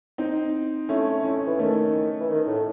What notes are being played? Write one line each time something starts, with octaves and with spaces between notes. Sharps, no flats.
C4 D#4
A3 C#4 E4
C#4 E4
E3
D#3 A3 C#4
E3
D#3
A2